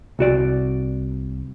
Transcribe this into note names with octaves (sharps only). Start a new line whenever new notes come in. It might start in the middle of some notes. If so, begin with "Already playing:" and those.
C2 F#4 D5